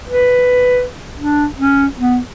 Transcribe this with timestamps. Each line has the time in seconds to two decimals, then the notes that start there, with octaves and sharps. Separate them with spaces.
0.09 B4
1.18 D4
1.58 C#4
1.99 B3